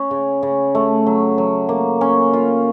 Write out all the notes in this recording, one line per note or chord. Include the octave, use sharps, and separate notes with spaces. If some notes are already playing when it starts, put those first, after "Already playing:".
Already playing: C#4
C#3
C#3
A3
F#3
F#3
A#3
C#4
F4